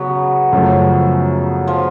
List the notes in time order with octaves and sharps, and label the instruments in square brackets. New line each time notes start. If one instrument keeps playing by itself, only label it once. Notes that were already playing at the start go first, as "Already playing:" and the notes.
Already playing: [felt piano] C#3 [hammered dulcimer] F#3 B3
[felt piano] F#2 C#3 F3 A3
[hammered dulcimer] F3